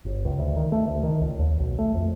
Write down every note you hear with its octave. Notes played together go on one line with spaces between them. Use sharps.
G1
C#2
D2
D#3
A3
D2
D#3
C#2
D#2
B1
A3
F2